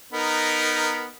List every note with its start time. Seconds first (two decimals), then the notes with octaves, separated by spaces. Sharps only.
0.13 B3 D#4 A#4